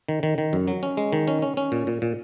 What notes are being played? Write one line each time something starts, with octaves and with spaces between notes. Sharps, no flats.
D#3
D#3
D#3
F#2
F#3
C#4
G#3
D#3
C#4
C#4
C#4
A#2
A#2
A#2